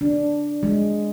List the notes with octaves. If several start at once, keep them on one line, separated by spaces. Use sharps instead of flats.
D4
G#3